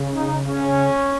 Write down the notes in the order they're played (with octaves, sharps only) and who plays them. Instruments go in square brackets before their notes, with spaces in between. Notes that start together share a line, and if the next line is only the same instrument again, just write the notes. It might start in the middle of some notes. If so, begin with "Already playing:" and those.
Already playing: [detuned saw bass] C#3
[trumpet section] D#4
C#4